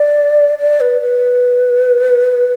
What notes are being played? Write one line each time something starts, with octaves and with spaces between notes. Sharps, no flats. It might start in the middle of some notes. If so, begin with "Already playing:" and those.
Already playing: D5
D5
B4
B4